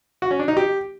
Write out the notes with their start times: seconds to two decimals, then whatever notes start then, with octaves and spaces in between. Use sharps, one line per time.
0.22 F#4
0.31 C#4
0.39 D4
0.48 D#4
0.57 G4